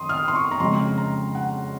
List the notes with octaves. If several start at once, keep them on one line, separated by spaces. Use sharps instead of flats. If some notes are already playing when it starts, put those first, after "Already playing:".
Already playing: F#2 D#3 C6 D#6
F6
C6
C#6
A#5
F2 C#3 G#3 C6
A#5
F#5